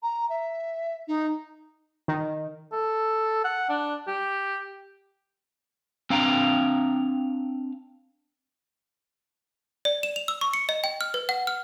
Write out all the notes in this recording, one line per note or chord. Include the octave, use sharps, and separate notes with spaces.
A#5
E5
D#4
D#3
A4
F#5
D4
G4
C4 D4 F5 G5 A#5
D5
E7
F7
E6
C#6
C#7
D#5
G5
F6
B4
F#5
F6